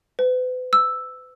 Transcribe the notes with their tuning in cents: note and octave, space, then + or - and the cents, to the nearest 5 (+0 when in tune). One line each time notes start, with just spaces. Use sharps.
B4 +40
E6 +0